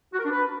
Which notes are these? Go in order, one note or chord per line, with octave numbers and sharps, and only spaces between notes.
F#4
A#4
D4
B4